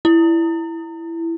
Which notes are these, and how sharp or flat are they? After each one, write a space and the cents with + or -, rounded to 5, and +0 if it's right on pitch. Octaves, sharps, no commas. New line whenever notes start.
E4 +10